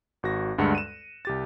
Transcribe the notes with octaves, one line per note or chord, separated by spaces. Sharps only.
G#1 F#4 A#6
D2 G2 G#3 F#5 F#6 C#7
D#7 E7
C2 G4 A6